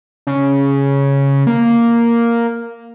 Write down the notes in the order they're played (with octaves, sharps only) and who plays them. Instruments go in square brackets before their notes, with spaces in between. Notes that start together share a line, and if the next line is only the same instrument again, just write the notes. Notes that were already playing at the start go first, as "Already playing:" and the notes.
[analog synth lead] C#3
A#3